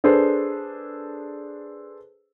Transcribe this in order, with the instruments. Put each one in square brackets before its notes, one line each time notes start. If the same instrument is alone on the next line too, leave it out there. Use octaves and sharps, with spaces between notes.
[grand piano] D4 G#4 A4 B4 C5